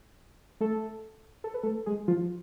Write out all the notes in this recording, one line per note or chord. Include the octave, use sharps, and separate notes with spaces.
A3 A4
A4
B4
A3 A4
G#3 G#4
F3 F4